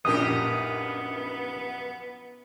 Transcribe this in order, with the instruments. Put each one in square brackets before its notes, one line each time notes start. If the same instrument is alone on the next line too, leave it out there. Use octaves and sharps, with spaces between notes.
[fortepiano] A#1 F#2 A#2 [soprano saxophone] B3 [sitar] D#4 G4 A#4 [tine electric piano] D#6